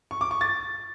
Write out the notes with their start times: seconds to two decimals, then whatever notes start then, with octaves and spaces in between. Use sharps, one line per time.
0.11 C#6
0.21 D6
0.31 C#6
0.41 A6